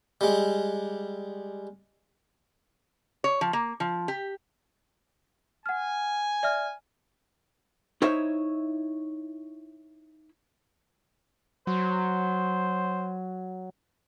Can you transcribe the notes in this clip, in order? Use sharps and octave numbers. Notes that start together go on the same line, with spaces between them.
G3 G#3
C#5
F3
A#3
F3
G4
F#5 G#5 F6
D5 E5 F6
D#4 E4 C5 C#5 D#5 E5
F#3 C5